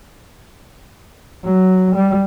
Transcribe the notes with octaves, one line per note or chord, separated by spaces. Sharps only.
F#3
G3